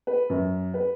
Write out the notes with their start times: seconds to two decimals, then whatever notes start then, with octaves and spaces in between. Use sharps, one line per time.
0.07 B4
0.30 F#2
0.74 B4